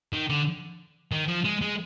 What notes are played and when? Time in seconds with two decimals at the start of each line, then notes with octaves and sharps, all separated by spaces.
0.13 D#3
0.29 D3
1.12 D#3
1.28 F3
1.44 G#3
1.62 G#3